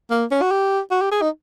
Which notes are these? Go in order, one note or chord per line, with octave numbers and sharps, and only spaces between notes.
A#3
C#4
F#4
G4
F#4
G4
G#4
D#4